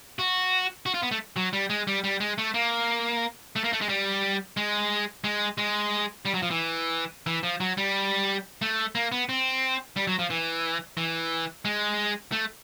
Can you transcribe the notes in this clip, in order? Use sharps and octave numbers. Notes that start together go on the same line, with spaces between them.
F#4
F#4
F4
B3
A3
F#3
G3
G#3
G3
G3
G#3
A3
A#3
A3
A#3
A3
G#3
G3
G#3
G#3
G#3
G3
F#3
F3
E3
E3
F3
F#3
G3
A3
A#3
B3
C4
G3
F#3
F3
E3
E3
G#3
A3